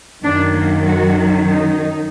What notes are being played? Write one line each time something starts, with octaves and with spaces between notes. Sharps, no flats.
F#2 D#3 F#3 D4
A#3
F#4
D#4